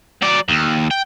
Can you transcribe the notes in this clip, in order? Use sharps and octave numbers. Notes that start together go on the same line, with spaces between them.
F#3 D5
D#2
G5